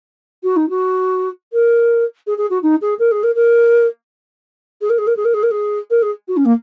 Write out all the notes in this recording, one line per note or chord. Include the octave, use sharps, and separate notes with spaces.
F#4
D#4
F#4
A#4
G#4
G#4
F#4
D#4
G#4
A#4
G#4
A#4
A#4
G#4
A#4
G#4
A#4
G#4
A#4
G#4
A#4
G#4
A#4
G#4
F#4
C#4
A#3